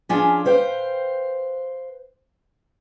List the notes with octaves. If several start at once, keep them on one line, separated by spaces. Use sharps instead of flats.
F3 C#4 D4 F4 G#4
B4 C5 F5 G5